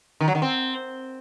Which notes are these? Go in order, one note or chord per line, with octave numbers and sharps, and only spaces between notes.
D#3
F#3
D#3
C4